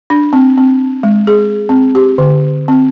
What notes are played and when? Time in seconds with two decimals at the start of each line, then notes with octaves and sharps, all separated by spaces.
0.10 D4
0.33 C4
0.58 C4
1.03 G#3
1.27 G#4
1.69 C4
1.95 G4
2.18 D3
2.68 C4